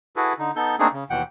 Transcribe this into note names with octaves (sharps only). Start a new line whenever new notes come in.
E4 F#4 G#4 A4 B4
D3 D#4
B3 D#4 A4 G6
A3 A#3 C4 D4 D#4 G#4
C#3
D#2 B2 E3 F#5 G5